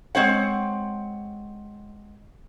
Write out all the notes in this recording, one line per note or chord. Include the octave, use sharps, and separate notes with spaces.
G#3 C4 C#5 F#5